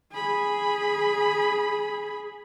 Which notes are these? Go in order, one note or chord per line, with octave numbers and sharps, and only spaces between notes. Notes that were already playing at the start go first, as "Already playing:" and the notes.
G#4 B5